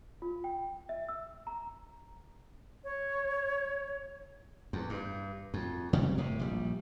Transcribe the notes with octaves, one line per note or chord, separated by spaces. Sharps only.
F4
G5
E5
E6
A#5
C#5
E2
G2
F2
E1 C3 F#3 G3
F#1 A2 C3
A#1 G3